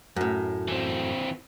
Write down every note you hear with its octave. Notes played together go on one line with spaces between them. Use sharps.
F#2 A2
E3 C4